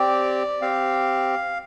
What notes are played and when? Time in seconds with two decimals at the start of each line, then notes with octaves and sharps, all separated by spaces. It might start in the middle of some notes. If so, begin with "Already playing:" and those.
Already playing: C4 G4 D5
0.62 C4 G4 F5